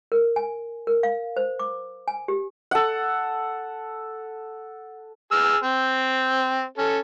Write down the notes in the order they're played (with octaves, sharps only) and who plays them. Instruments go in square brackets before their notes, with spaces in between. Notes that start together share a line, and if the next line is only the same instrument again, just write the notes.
[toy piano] A#4
G#5
A#4
F5
C5
D6
G#5
G4
[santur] A4 F#5
[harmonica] G#4 E6 F6
C4
C#4 A4